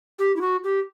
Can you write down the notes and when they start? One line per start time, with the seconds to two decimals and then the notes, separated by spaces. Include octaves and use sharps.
0.19 G4
0.36 E4
0.41 F#4
0.64 G4